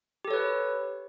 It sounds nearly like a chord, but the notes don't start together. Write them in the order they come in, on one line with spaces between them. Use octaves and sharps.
G4 A4 C#5 B4